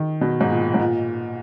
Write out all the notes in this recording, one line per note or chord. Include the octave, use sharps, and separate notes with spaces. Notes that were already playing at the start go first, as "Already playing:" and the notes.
Already playing: D#3
B2
G#2
A#2
G#2
A#2